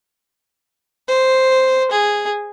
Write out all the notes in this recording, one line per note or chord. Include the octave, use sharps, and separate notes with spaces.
C5
G#4